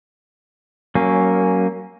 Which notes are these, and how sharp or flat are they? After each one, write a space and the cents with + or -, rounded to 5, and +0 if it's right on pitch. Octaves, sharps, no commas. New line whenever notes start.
F#3 +25 A#3 +0 C#4 +0